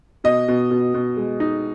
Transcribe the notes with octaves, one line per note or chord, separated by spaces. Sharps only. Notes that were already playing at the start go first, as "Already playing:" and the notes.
B2 D#5
B2
B2
B2
G#3
D#4